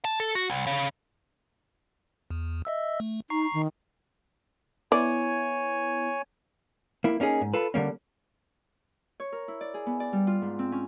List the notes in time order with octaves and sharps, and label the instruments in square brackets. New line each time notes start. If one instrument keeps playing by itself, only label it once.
[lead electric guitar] A5
A4
F#4
C2
C#3
[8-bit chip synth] E2
D#5 E5 E6
A3
[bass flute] D#4 [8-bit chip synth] A#5 C#6 C7
[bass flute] D#3
[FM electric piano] B3 E4 [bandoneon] C#5 G#5 [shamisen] D5
[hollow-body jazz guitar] A#3 E4
A#3 C#4 D#4 G#4
G#2
F4 A4 B4
D3 G3 A#3 C#4
[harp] C#5
A#4
E4
D5
G#4
B3
D5
G3
F4
G#2
C4
C#4